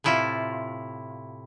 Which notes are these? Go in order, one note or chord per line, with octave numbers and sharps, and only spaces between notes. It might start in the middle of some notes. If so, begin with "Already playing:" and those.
A2 C3 E4 F4